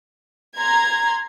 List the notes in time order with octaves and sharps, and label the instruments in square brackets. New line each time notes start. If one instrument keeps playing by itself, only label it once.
[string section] A#5 C6 G#6